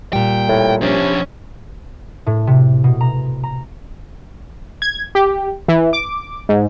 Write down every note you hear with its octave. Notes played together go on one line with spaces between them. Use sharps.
A#2 G3 G5
A2
C3 F3 C#4 D4
A2
C3
B2
A#5
A#5
G#6
G4
E3
D6
G#2